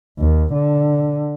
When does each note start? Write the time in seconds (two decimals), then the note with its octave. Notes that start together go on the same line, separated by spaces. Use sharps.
0.19 D#2
0.53 D3